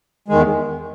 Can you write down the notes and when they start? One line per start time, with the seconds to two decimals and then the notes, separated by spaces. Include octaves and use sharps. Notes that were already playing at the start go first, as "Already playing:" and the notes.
0.28 E2 D#3 G#3